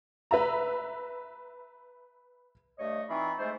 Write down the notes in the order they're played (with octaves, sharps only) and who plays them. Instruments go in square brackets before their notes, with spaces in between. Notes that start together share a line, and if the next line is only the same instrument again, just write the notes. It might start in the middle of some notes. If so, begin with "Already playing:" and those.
[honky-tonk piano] B4 E5 A#5
[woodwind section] G2 A3 C#5 D#5
E3 C4 D#4 F4 B5 C#6
G#3 A3 C5